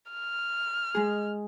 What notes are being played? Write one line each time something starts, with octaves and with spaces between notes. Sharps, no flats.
F6
G#3 G#4